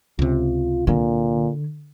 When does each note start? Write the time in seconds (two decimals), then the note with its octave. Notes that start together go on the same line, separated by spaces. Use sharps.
0.19 C#2 C3 F4
0.87 A#2 D3